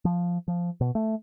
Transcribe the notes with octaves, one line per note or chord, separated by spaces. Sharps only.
F3
F3
B2
A3